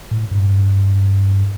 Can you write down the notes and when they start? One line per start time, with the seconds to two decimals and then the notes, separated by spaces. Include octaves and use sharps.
0.11 A2
0.31 G2